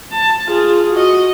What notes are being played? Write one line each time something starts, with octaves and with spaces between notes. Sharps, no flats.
A5
F4 G#4
F#4 D#5